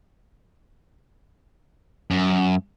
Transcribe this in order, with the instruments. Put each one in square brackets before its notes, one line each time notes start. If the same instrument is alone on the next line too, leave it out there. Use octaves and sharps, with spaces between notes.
[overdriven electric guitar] F#2